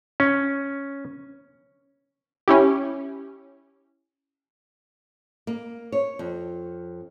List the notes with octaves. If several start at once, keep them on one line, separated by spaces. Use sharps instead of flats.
C#4
C#4 E4 G4
A#3
C#5
F2